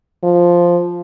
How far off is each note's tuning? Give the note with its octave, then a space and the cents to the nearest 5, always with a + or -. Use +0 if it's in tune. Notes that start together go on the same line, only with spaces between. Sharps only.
F3 +0